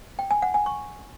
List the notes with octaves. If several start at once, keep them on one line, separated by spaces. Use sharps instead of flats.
G5
G#5
F#5
G#5
C#6